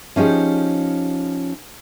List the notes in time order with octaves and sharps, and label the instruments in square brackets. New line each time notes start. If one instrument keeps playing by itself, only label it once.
[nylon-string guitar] F3 C#4 D#4 G4 G#4